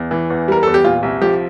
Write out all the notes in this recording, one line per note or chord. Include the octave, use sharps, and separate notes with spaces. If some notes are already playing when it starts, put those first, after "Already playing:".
Already playing: E2
E3
E2
G3 A#4
E2 A4
G4
A#2 F4
C2
F3 G4